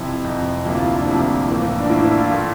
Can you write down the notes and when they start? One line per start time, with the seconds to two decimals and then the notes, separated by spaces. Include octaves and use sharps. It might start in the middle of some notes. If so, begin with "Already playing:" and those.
Already playing: F2 C3 F3 E4
0.24 F2 C3 F3
0.65 D2 C3 F3 A#3 E4
0.75 F4
0.86 E4
0.96 D4
1.07 D2 C3 F3 A#3 E4
1.49 A2 E3 A#3
1.79 D4
1.90 A2 E3 A#3 E4
2.03 E4
2.17 F4
2.31 A#2 F3 A3